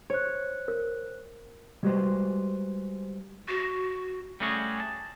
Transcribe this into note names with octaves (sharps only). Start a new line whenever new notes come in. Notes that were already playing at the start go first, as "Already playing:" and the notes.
C5 C#5 F#6
A#4
G3 G#3 F#4 G4 B4 C5
F#4
G3 A3 C#4 F#4 G#4 C#5
A5